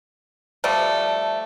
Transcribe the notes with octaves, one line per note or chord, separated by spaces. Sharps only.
F3 G3 A3